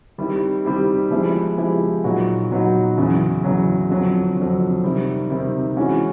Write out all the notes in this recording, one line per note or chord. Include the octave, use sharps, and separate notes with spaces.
D#3 G3 C4 E4 G4
D#3 G3 C4 E4 G4
F3 G#3 B3 E4 G4
F3 G#3 B3 E4 G4
A#2 F#3 B3 D#4 F#4
A#2 F#3 B3 D#4 F#4
E2 C#3 F#3
E2 C#3 F#3
F2 D3 F#3
F2 D3 F#3
C3 D#3 G3 C4
C3 D#3 G3 C4
E3 G#3 C#4 F#4